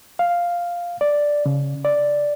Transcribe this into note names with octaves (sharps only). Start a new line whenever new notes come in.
F5
D5
C#3
D5